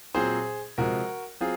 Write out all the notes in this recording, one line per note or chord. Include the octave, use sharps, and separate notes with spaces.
A#2 F#3 C4 G#4 C5
C3 F3 G#3 F#4 A#4
F#3 C4 F4 G#4